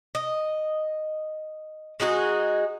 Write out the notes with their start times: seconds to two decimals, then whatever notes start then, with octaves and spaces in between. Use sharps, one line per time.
0.15 D#5
2.00 G#3 D#4 F#4 G#4